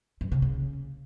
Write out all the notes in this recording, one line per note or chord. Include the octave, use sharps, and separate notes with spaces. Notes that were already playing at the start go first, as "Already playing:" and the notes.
G2
C#3
C#3